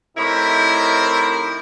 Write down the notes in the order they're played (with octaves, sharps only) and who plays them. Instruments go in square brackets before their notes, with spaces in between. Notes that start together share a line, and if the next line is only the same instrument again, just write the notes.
[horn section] A2 C3 D#4 E4 A#4 C5